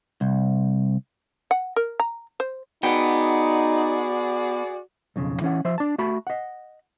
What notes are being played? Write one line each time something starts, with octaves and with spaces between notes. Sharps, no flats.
C2
F#5
A#4
A#5
C5
B3 D#4 F#4 G#4 D5 G5
B1 F2 C#3
E3 C#4 F#5
F3 C5 E5
D4 A5
A3 F#4 A5 B5
D#5 F#5